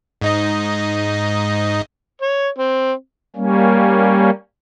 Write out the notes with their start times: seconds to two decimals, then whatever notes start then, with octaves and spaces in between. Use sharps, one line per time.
0.21 G#2 D#4 D#5
2.22 C#5
2.58 C4
3.36 G3 A#3 C#4